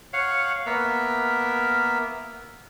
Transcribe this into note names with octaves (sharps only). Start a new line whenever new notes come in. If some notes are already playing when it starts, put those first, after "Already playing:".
C#5 F5 F#5
A#3 B3 A#4 E5